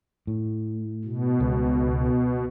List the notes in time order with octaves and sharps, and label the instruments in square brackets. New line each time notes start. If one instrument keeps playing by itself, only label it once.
[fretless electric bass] A2
[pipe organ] B2
[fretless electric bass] C#2 G#3